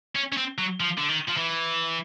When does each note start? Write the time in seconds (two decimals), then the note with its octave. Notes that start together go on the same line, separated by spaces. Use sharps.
0.15 C#4
0.32 C#4
0.37 C4
0.58 F#3
0.80 F3
0.98 D3
1.09 D#3
1.29 F3
1.37 E3